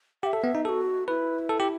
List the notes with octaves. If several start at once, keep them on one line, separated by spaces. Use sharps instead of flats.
G4 F#5
E5
A4
B3
D#4
F#4 G#4 A4
E4 B4
A4
G4